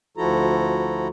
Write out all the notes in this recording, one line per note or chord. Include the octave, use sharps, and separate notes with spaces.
D2 F3 E4 F#4 A4 A#5